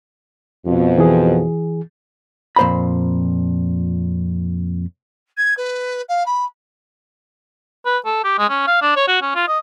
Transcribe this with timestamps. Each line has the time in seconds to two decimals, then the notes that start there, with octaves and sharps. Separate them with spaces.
0.66 F2 B2
0.98 E3 G#4
2.56 F2 A#2 C5 A#5 B5
5.37 G#6
5.57 B4
6.09 F5
6.26 B5
7.85 B4
8.06 A4
8.24 G4
8.38 G#3
8.50 C#4
8.67 F5
8.82 D4
8.96 C#5
9.08 F#4
9.22 C#4
9.35 F4
9.48 D#5